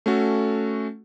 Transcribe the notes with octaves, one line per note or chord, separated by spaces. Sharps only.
A3 C#4 F#4 A4